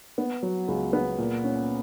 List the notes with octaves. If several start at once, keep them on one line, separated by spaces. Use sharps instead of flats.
B3
F#3
C#2
B3
A#2
C#4